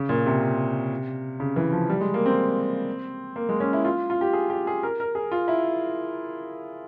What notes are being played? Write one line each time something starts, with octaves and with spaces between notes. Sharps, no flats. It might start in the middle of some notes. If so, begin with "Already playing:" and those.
Already playing: C#3
A#2
C3
C#3
E3
F3
G3
G#3
A#3
C4
A#3
G#3
C#4
E4
F4
F4
G4
G#4
G4
G#4
A#4
A#4
G#4
F4
E4